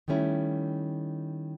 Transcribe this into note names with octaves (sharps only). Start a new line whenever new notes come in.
D#3 G3 A3 C#4 E4